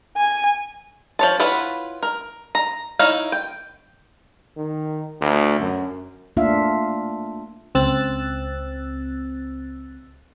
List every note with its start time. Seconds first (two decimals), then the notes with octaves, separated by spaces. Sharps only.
0.17 G#5
1.19 F3 C#5 A5
1.40 E4 F4 B4 C#5 F#5
2.03 A#4
2.55 A#5
2.99 D#4 E4 C#5 F5
3.32 G5
4.57 D#3
5.21 D2
5.60 F#2
6.37 A3 A#3 D4 F4 E5 F5
7.75 C#2 C4 E6 F#6 A6